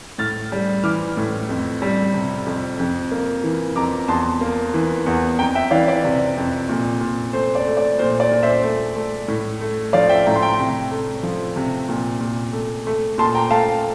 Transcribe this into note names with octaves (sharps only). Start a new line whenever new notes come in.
A2 F6 A6
G3
E3 D6 F6
A2
F2
G3
C3
F2
F2
A#3
E3
F2 A#5 D6
E2 A5 C6
A#3
E3
E2
F2 G5 A#5
E5 G5
E3 D5 F5
D5
C3
F2
A#2
A#2
A3 C5
D5
A3
D5
A#2 C5
D5
A#2
C5 E5
A3
A3
A2
A3
F3 D5 F5
E5 G5
A2 G5 A#5
C6
G5 A#5
C3
A3
F3
C3
A#2
A#2
A3
A3
A#2 A5 C6
G5 A#5
A3 F5 A5